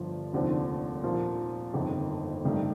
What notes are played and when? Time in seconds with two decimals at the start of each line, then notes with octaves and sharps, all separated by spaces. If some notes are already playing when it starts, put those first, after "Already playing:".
Already playing: G1 G2 F3
0.33 F1 D#2 D3 F3 C4
1.03 A#2 F3 A#3 F4
1.73 G1 F2 D#3
2.44 G2 D#3 A3